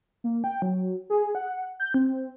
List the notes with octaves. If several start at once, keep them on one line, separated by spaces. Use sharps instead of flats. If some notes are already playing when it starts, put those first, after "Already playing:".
A#3
G5
F#3
G#4
F#5
G6
C4